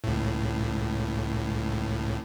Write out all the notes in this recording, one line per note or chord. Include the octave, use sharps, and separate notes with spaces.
C#2 A2